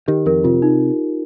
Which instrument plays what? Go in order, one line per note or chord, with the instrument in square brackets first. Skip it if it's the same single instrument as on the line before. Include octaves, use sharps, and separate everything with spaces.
[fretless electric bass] D#3 [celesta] G4
[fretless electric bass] F2 [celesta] A#4
[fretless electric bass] C3 [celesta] F4
[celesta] D#4